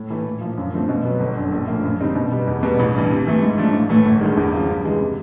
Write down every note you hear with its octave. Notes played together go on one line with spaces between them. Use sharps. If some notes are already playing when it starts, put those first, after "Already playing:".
Already playing: A2
E3 A3
A#2
F3 A#3
F#2
D3 F3 A3 C4
B2
F#3 B3
G1
F#2 D3
A#1
A2 F3 A#3
F#2
D3 G3 C4 D#4
B2
G3 B3
E2
B2 G3 B3
A1
G2 E3
C3
E3 A3
G#2
F3 A3 D4
A1
A2 E3 A3
G1
G2 D#3 G#3
E2
C#3 F3
G2
E3 G#3
C3